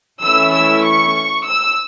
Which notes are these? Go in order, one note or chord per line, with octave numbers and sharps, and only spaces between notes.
E3 A3 C#4 E4 E6
E6
C#6
E6